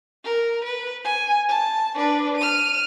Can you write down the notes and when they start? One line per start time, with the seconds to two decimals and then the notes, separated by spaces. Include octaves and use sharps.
0.25 A#4
0.64 B4
1.05 G#5
1.49 A5
1.95 D4 B4
2.37 F6 D#7